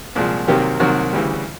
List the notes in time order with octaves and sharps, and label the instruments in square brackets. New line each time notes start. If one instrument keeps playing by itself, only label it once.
[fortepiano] C2 A#2 F3 G#3
C2 C3 D#3 F#3 A#3 G4
C2 C3 D#3 F#3 A#3 F#4
D2 C#3 E3 G3